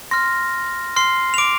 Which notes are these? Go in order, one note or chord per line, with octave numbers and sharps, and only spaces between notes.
C6 F6 A#6
C6 F6 C7
F7
D6 D7